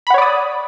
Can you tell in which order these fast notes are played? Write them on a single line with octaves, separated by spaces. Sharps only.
B5 F#5 C#5 D5 D#6